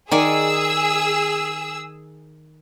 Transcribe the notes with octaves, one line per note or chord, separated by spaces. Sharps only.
D#3 G#4 D5 G#5 E6